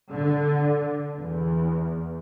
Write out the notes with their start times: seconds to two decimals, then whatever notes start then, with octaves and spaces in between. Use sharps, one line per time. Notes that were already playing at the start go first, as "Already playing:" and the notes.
0.11 D3
1.17 E2